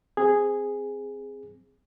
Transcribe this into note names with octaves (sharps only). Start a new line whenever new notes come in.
C4 G#4